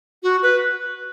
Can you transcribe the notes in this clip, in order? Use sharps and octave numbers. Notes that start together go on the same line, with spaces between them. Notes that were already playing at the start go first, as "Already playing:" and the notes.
F#4
B4